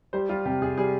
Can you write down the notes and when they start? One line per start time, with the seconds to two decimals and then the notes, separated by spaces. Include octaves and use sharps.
0.13 G3 C5
0.29 G3 F4
0.45 C3 G4
0.62 C3 G#4
0.78 G3 G#4